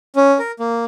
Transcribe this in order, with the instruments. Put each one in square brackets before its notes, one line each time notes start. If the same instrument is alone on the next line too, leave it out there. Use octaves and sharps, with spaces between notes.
[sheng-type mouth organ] C#4
A#4
A#3